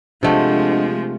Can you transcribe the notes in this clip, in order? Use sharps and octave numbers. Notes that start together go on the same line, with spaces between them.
C3 F3 G#3 A3 D4 D#5 F#5